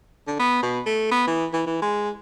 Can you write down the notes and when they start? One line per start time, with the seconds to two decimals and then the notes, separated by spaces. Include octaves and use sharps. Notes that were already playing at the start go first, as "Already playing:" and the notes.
0.27 D3
0.39 B3
0.63 B2
0.86 A3
1.11 B3
1.27 E3
1.53 E3
1.66 E3
1.82 G#3